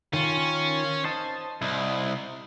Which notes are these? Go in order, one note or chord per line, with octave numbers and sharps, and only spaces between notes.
D#3 C#4 F4
C5 D#5 A5
C2 E4 D#5